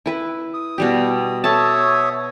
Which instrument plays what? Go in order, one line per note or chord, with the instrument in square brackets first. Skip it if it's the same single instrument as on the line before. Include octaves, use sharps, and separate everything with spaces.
[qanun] E4 B4
[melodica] D#6
[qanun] B2 G3 G4
[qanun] A4 A5 [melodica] C#5 E5 D#6